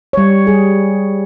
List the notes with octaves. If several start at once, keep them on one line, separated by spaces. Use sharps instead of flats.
G3 C#5
G3 G#4